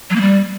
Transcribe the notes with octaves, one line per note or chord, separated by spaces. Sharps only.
F#3
A#3
G3